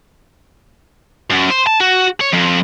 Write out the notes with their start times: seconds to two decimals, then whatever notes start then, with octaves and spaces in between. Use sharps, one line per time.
1.30 F#2
1.50 C5
1.67 A5
1.80 F#4
2.21 C#5
2.33 F2